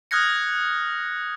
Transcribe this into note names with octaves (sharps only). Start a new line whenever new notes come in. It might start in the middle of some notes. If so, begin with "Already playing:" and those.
D#6 F6 F#6 G#6 A#6 C#7